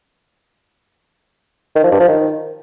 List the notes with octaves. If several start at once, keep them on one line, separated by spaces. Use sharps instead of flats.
D#3
F3
G2
F3
D#3